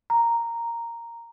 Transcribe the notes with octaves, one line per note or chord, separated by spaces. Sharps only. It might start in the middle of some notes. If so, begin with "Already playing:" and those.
A#5